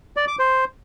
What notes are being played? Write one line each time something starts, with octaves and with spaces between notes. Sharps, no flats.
D5
D6
C5